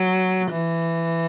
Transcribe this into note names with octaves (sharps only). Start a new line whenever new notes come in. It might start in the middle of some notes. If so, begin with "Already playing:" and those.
Already playing: F#3
E3